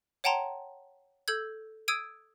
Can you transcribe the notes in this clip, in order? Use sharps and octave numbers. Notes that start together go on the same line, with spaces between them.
C#5 F#5 G5 A5 A#5 C6
A4 E6 G6 G#6
D#6 E6 G#6 D7 D#7